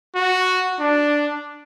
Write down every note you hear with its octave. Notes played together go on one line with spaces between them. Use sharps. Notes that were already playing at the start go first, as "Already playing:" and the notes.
F#4
D4